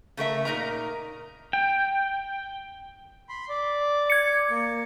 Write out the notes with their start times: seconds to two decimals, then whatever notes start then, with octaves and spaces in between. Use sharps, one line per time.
0.17 C#3 A3 A#4 E5
0.45 A#2 D#4 A#4 A#5
1.53 G5
3.29 B5 C6
3.49 D5
4.10 G#6 C#7
4.50 A#3